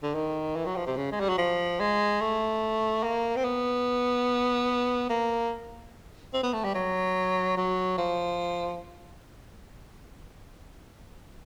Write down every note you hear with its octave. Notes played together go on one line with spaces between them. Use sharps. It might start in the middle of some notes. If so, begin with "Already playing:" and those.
D3
D#3
E3
F#3
F3
C3
C#3
G#3
G3
F#3
F3
G#3
A3
A#3
C4
B3
A#3
C4
B3
A3
G3
F#3
F#3
F3